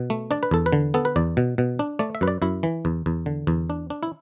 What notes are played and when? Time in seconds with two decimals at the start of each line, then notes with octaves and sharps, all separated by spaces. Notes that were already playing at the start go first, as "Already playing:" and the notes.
Already playing: B2
0.10 A3
0.31 D4 D5
0.43 B4
0.51 E2 A4
0.66 B4
0.73 D3
0.94 B3 A4
1.05 B4
1.16 E2 D5
1.37 B2
1.58 B2
1.79 D4
1.99 A3 D5
2.15 E5
2.21 F#2 B4
2.28 D5
2.42 F#2 E4
2.63 E3
2.85 E2
3.06 E2
3.26 D3
3.47 E2
3.70 D4
3.90 D4
4.03 E4